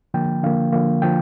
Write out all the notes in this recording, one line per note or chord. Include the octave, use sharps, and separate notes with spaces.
D3 F3 A#3 G5
D3 F3 A#3 F5
D3 F3 A#3 F5
D3 F3 G5